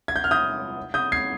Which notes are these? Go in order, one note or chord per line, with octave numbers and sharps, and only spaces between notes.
G#6
G6
F6
D#6 G6
D#6 G6
G#6 C7